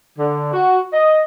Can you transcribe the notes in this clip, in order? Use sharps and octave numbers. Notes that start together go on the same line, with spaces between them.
D3
F#4
D#5